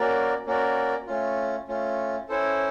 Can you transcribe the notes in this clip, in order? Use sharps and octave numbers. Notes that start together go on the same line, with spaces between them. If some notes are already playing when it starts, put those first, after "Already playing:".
Already playing: A#3 C#4 F#4 A#4 D5
A#3 C#4 F#4 A#4 D5
A3 C#4 F4
A3 C#4 F4
C#4 E4 A4 C5